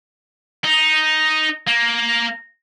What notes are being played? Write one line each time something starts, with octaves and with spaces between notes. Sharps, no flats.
D#4
A#3